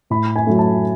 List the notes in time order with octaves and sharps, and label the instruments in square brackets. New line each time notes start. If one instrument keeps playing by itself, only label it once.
[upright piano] A2 B5
G#5
F#3 A3
A5